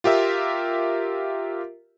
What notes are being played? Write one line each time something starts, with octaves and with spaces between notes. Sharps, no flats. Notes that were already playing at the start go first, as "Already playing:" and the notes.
F4 G4 A#4 E5